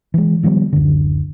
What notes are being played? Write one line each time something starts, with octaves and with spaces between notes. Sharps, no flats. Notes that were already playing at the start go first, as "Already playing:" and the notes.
E3 G#3
D#3 F3 G3 B3
D1 F#2 D3